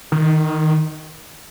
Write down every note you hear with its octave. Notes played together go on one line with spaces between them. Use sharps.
D#3